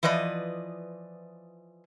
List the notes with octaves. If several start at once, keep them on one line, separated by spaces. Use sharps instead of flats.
E3 F3 B4 D5 D#5